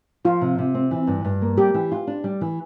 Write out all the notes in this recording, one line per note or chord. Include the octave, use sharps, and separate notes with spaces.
F3 F4
C3
C3
C4
E3
G2
G2
A#3
G3 G4
E3
F4
D4
G3
E3